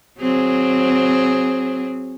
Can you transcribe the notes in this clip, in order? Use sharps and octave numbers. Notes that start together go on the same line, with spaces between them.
F#3 C4 G#4